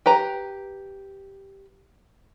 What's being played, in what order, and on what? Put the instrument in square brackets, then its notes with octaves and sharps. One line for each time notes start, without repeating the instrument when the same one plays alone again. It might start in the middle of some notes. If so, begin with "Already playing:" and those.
[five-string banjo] G4 B4 A#5